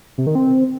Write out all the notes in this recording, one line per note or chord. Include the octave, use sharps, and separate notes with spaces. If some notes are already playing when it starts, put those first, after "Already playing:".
C3
D#3
C4